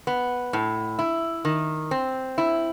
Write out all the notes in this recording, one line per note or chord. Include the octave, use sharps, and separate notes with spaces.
B3
A2
E4
D#3
C4
E4